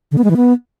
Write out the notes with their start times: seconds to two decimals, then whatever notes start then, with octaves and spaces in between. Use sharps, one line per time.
0.12 D3
0.18 B3
0.24 G#3
0.30 E3
0.37 B3